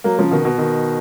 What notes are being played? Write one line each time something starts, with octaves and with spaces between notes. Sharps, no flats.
F#3 A#3
C#3 F3
B2 D#3
B2
B2 D#3